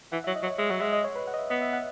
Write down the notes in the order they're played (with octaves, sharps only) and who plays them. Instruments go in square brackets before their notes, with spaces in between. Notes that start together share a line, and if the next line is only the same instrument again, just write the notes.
[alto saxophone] E3 [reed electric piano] F#5
[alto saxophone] F#3 [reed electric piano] E5
[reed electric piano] D#5
[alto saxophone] F#3
[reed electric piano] C#5
[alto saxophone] G#3 [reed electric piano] E5
[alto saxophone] F#3 [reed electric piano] F#5
[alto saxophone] G#3 [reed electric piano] E5
[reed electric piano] D#5
C#5
B4
F#5
D#5
E5
[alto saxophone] B3 [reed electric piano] D#5
[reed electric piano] E5
F#5